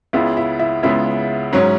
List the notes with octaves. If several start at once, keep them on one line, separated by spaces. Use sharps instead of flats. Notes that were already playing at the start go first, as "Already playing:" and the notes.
C#2 C#3 G#3 B3 E4 E5
E4 E5
E4 E5
C#2 C#3 G#3 B3 E4 E5
G#2 F#3 C#4